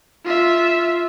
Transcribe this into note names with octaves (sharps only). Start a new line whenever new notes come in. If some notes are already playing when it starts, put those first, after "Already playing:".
F4 E5